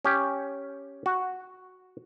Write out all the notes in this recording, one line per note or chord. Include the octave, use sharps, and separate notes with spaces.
C#4 G4
F#4